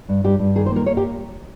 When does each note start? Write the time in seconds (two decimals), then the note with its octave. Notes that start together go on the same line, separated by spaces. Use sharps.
0.09 G2
0.24 G2 G4
0.39 G2
0.55 D#3 G#4
0.66 C5
0.71 A#3 A#4
0.86 A#3 C#5
0.97 G4